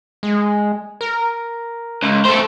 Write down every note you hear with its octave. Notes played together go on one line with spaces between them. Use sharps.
G#3
A#4
C#2
A3 A4 C5